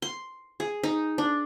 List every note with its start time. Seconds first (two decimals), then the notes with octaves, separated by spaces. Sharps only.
0.02 C6
0.60 G#4
0.83 D#4
1.18 D4